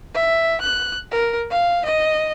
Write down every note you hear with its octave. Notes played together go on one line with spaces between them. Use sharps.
E5
F#6
A#4
F5
D#5